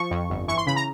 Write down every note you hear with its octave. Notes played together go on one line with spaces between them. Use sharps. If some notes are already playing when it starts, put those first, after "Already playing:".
Already playing: F3 C#6
F2
G1
E3 C#6
C6
C#3 B5
A#5